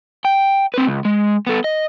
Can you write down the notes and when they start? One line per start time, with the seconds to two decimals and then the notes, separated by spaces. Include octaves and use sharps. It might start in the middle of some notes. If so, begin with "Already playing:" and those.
0.25 G5
0.74 C4 B4
0.87 C#2
1.05 G#3
1.47 B3 A4
1.64 D#5